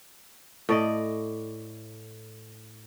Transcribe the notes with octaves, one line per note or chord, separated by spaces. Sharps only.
A2 D5 D#5